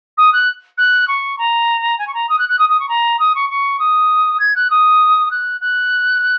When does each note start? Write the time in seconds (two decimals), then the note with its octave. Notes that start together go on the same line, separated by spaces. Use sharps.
0.17 D#6
0.32 F#6
0.77 F#6
1.07 C#6
1.38 A#5
1.98 G#5
2.07 C#6
2.14 A#5
2.29 D#6
2.38 F#6
2.49 F#6
2.58 D#6
2.69 D#6
2.79 C#6
2.88 A#5
3.19 D#6
3.35 C#6
3.49 C#6
3.79 D#6
4.39 G#6
4.55 F#6
4.70 D#6
5.31 F#6
5.60 F#6